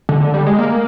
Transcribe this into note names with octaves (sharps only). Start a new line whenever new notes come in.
D3
D3
G3
G#3
A#3